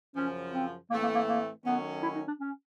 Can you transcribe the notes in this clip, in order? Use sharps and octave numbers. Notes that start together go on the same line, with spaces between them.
F#2 C#3 F3 C#4
C4
A2 E3 A3 A#3 C4
A#3
A#3
A#3
D#3 F#3 A3 B3 C#4
E4
D#4
D4
C#4